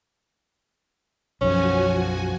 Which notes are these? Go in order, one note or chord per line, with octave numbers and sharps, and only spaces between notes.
B1 F#2 F3 C#4 F#4 G#5